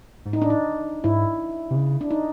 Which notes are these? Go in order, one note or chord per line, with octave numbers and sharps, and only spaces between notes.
G#2
A2 D#4
D4
D#4
G#2 E4
C3
C#3
D4
D#4